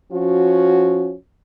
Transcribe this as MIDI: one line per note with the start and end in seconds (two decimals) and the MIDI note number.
0.12 1.13 53
0.12 1.13 61
0.12 1.13 66